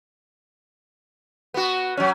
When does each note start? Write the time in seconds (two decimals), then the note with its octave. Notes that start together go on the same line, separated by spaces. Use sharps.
1.54 B3 F#4
1.97 F#3 C#4